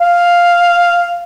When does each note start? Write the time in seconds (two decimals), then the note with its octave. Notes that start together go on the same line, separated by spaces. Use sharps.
0.01 F5